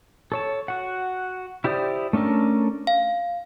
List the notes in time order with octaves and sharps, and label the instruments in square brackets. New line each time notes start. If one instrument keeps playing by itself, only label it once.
[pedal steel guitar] A4 C#5 A5
F#4 F#5
E4 G4 C5 D5 D#6
A3 C#4 D4 A4 A#4
[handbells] F5